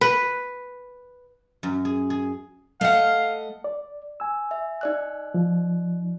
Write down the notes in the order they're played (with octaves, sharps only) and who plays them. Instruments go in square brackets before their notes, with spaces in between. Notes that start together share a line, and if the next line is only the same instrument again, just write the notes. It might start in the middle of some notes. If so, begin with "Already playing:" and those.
[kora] B4
[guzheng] F#2
G#4
G#4
[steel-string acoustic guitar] A3 D#5 F#5 [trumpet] F5
[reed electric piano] D5
G#5 E6
[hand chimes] E5
D#4 D5 F#6
[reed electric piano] F3